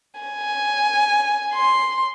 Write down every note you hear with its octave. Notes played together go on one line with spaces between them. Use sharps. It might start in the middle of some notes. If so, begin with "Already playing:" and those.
G#5
C6